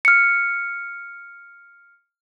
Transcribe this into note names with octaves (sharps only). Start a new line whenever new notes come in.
F6 C#7